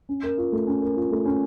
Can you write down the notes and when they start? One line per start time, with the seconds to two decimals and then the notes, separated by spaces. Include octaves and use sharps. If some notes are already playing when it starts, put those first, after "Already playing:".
0.09 C#4
0.23 A#4
0.38 F4
0.52 A3
0.67 C#4
0.82 A#4
0.96 F4
1.11 A3
1.25 C#4